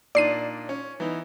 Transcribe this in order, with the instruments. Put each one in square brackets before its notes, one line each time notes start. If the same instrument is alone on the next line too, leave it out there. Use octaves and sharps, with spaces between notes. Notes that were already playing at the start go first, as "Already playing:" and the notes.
[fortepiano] A#2 D4 D#4 [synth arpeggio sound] D5 C7 D#7
[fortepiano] C#4
E3 B3 D#4